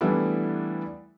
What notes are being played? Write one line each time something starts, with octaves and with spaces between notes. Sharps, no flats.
E3 G3 A3 B3 D4 E4